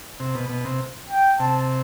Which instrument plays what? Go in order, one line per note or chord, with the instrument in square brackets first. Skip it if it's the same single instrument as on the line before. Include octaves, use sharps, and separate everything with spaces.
[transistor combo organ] C3
B2
B2
C3
[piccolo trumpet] G5
[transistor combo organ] C3 [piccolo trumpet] A5